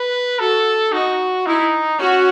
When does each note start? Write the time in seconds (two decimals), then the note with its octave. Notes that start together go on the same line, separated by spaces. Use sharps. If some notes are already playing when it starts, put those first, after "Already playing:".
Already playing: B4
0.39 F#4 A4
0.93 D#4 F#4
1.46 D#4 E4
2.00 C#4 F#4